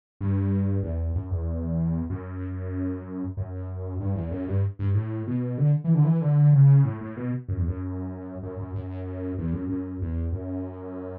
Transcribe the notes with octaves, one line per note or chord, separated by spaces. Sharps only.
G2
E2
F#2
E2
F#2
F#2
G2
E2
F#2
G2
G2
A2
B2
D3
E3
D3
E3
D3
C#3
A2
A2
B2
F#2
E2
F#2
F#2
F#2
F#2
E2
F#2
F#2
E2
F#2